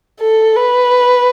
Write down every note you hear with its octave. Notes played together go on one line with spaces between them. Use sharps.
A4
B4